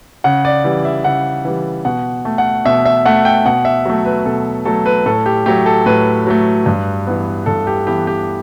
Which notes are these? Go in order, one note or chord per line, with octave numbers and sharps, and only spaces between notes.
C#3 F#5
D5
E3 G3
E5
C#3 F#5
E3 G3
B2 F#5
A3
F#5
B2 E5
E5
A3 F#5
G5
B2 F#5
E5
F#3 A3
B4
B2 A4
F#3 A3 A4
B4
A2 A4
G4
F#3 A3 G4
A4
A2 B4
F#3 A3
G2
E3 B3
G2 A4
G4
E3 B3 G4
G4